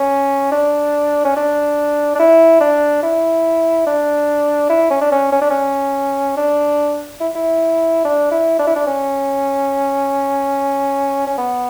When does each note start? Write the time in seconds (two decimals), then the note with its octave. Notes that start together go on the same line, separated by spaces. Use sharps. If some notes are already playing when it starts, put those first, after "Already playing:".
Already playing: C#4
0.52 D4
1.24 C#4
1.36 D4
2.15 D4
2.19 E4
2.61 D4
3.03 E4
3.86 D4
4.70 E4
4.90 C#4
5.01 D4
5.12 C#4
5.32 C#4
5.41 D4
5.50 C#4
6.37 D4
7.20 E4
7.35 E4
8.04 D4
8.31 E4
8.59 D4
8.67 E4
8.75 D4
8.87 C#4
11.27 C#4
11.38 B3